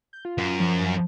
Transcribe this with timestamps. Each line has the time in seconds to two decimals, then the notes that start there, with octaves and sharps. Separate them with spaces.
0.13 G6
0.25 F4
0.38 F#2
0.60 F3